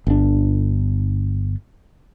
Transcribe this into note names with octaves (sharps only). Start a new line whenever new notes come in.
G1 D4